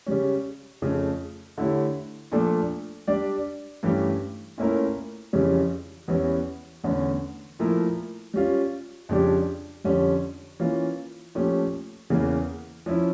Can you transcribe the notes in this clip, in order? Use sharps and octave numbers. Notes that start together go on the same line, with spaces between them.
C#3 G3 C#4
F2 C#3 F3 A3
D3 A3 E4 G4 C#5
A#2 F3 A3 D4 A4
G3 D4 G4 D5
G2 E3 A3 C#4 G4
A#2 A3 C#4 E4 A#4
F2 C#3 E3 G3 C#4
E2 E3 G3 C#4 E4
E2 D3 A3 C#4
A#2 F3 A3 E4 A#4
G3 C#4 F4
F2 C#3 G3 D4 G4
F2 D3 G3 C#4
E3 A#3 C#4 F4
A#2 F3 A3 C#4 G4
E2 C#3 E3 A#3
F3 C#4 E4